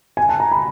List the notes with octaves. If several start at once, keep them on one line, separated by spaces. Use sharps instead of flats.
G#5
A5
A#5
B5